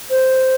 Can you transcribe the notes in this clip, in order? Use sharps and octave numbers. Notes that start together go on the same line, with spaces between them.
C5